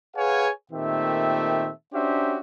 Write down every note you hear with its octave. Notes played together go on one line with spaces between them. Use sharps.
G#4 B4 C#5 F5 F#5 G#5
A#2 D#3 A3 C4 G4 E5
C#4 D4 F#4 G4 C5 E5